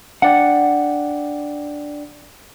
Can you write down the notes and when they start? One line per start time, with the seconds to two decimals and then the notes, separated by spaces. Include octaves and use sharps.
0.22 D4 D5 F#5 G5